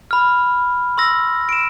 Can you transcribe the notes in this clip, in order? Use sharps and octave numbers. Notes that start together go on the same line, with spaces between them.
B5 F6
C6 E6 A#6
D7 E7